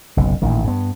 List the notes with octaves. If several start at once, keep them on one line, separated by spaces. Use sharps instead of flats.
F#1 B1 C3
A1 A#2 D#3
G2 B3